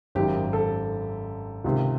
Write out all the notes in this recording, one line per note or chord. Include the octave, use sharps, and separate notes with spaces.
G#1 F#2 D#3 G4
A4
C#2 C3 D#3